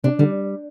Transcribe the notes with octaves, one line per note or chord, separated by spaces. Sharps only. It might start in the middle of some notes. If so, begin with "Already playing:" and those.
C3 D4
D3 G3